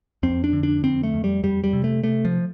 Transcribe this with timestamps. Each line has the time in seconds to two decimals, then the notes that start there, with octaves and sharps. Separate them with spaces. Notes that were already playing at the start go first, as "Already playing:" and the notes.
0.23 F2 C4
0.44 D4
0.53 D3
0.63 D4
0.83 F2 C4
1.03 A3
1.14 F2
1.24 G3
1.43 F2 G3
1.64 G3
1.73 C3
1.84 A3
2.04 C3 A3
2.25 F3